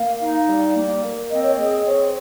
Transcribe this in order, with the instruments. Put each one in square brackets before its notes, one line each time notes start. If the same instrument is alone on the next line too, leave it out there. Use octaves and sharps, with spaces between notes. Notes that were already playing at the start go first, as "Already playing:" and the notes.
Already playing: [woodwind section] A#3 [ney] F5
[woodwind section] D#4
G3
A#3
A#3
[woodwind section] C4 [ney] D#5
[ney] C#5
[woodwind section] G#4 [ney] D#5
[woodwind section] C4 [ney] C#5